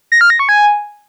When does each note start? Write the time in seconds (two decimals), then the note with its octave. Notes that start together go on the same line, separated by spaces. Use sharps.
0.12 A#6
0.21 F6
0.30 A#6
0.39 C#6
0.49 G#5